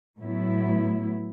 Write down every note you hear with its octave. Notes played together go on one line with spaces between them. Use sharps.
A2 F#3 B3 E4